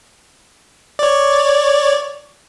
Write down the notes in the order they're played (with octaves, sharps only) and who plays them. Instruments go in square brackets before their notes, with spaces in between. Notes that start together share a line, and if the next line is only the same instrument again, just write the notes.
[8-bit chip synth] C#5 D5